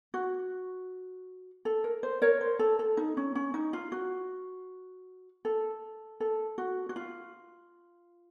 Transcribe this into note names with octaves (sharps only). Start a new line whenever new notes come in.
F#4
A4
A#4
C5
A#4 C#5
C5
A4
A4
D#4
C#4
C#4
D#4
F4
F#4
A4
A4
F#4
F#4
F4